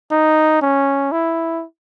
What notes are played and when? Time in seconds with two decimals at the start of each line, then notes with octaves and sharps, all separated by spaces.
0.11 D#4
0.62 C#4
1.12 E4